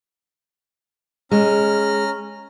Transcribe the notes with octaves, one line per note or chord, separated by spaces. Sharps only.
G#3 C#4 A#5 F6